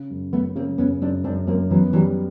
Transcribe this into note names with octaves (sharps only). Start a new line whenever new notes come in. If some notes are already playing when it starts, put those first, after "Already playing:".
Already playing: C#3
F#2
F#2 A3 B3
C#3 A#3 C4
F#2 B3 C#4
F#2 C4 D4
F#2 C4 D4
F#2 A#3 C4
E3 F#3 B3
E3 F#3 G3